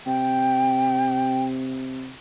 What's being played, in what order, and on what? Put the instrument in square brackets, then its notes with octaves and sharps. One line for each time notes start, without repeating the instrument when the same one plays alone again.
[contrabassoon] C3 [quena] G5